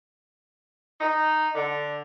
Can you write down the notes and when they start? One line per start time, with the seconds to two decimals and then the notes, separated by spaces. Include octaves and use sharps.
1.00 D#4
1.54 D3